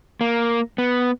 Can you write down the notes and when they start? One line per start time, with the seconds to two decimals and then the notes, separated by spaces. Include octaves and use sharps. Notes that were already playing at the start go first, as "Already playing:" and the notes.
0.21 A#3
0.78 B3